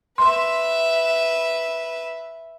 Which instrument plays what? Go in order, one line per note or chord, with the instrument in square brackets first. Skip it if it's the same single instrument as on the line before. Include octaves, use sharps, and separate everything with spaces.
[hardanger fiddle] B4 E5 [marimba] C6